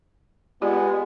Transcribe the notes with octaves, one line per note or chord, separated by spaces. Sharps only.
G#3 B3 F4 G4 D5